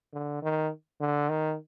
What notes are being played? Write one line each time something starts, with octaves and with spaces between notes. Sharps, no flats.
D3
D#3
D3
D#3